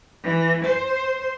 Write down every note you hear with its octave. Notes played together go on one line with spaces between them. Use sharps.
E3
C5